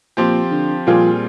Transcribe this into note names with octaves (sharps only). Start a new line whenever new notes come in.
A#2 F3 C4 G4
D3
A#2 F3 G3 C4 F4 G#4